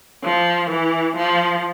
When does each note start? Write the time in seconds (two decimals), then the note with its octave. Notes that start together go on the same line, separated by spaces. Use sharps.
0.24 F3
0.70 E3
1.16 F3